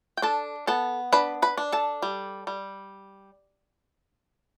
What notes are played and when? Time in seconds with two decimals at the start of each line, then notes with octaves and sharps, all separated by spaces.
0.17 G5
0.22 D4 A4 A5
0.67 B3 A4 A5
1.13 D4 B4 B5
1.42 B4 B5
1.58 D4
1.72 A4 A5
2.02 G3
2.47 G3